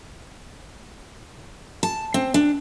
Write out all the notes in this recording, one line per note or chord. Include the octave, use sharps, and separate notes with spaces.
A5
C4
D4